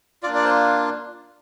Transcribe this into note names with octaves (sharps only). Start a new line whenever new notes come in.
A#3 D4 F4 D5
D5
C5